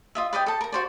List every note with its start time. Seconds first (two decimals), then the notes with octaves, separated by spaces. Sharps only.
0.15 F4 D#5 E5
0.33 B4 D5 D#5 G5
0.46 A4 A5
0.61 A#4 A#5
0.72 F#4 C5 D5